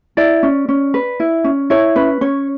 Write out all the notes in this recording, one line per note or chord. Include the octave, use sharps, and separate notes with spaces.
E4 D5
C#4
C#4
B4
E4
C#4
E4 C#5
C#4 B4
C#4 C#5